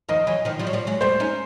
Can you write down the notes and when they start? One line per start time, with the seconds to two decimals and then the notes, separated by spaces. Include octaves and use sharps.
0.09 D#3 F3 D#5
0.27 E3 F#3 D#5
0.45 D#3 F3
0.59 F3 G3
0.67 F#3
0.73 F3 G3
0.87 F#3 G#3
1.01 G3 A3 C5
1.20 C#4 D#4